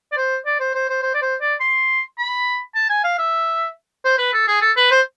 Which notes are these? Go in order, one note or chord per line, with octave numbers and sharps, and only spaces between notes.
D5
C5
D5
C5
C5
C5
C5
D5
C5
D5
C6
B5
A5
G#5
F5
E5
C5
B4
A4
G#4
A4
B4
C5